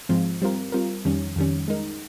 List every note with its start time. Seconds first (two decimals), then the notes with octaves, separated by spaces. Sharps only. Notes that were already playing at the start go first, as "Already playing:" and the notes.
0.09 G#2 F3 G#3 C4 F4
0.42 G3 C4 F4 A#4
0.72 G3 C4 F4 A#4
1.05 F2 D#3 G3 C#4
1.36 F2 D#3 G3 C#4
1.68 G#3 D#4 A#4